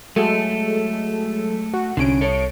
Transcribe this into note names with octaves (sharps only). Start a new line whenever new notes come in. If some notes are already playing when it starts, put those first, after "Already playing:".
F#3 G#3 A3 A4
F#4
C2 D3 C#4 D7
A4 C#5